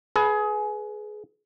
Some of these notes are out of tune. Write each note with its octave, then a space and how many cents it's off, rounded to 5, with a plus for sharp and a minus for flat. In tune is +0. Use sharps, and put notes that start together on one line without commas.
G#4 +25 B4 +0